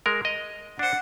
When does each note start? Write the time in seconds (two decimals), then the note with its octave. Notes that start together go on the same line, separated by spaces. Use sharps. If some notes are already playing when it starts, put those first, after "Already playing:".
0.06 G#3 A#4
0.25 D#5
0.79 D4 C5 F#5